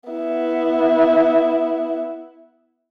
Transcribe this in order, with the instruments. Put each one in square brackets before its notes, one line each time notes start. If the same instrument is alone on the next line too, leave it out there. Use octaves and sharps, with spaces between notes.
[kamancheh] B3 E4